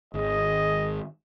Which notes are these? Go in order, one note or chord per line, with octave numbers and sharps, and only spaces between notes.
G#1 D#3 G#4 D#5